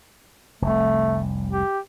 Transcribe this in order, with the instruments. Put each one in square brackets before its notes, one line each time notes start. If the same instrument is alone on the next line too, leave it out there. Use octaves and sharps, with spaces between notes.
[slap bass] F1 C2 [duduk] A3
[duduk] G4